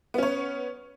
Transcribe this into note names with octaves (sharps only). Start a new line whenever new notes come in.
B3 C#4 C#5